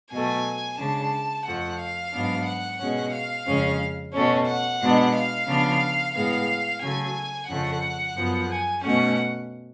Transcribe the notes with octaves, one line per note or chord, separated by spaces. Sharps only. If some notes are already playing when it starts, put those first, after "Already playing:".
B2 F#3 A3 G#5
C#3 G#3 D4 A5
F2 F3 A3 F#5
F5
G#2 F#3 B3 D4
F#5
B2 G#3 C#4
F5
F2 C#3 G#3 C#4
B2 A3 C#4
F#5
B2 G#3 B3 D4
F5
C#3 F3 B3 D4
A2 G#3 B3 F5
C#3 F#3 A3 G#5
F2 C#3 F3 A3 F#5
F#2 F3 B3
G#5
B2 A3 C#4 F#5